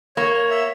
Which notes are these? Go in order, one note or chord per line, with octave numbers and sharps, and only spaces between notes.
A#3 C#5
C#5
E5